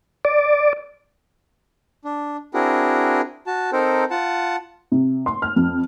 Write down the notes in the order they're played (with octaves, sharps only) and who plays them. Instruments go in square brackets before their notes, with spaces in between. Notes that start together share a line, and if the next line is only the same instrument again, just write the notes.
[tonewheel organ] D5
[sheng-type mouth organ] D4
C4 D4 E4 F#4 G#4 A#4
F#4 A5
C4 D#4 A4 A#4 C5
F4 F#5 A5
[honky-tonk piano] C3
C6
F6
F2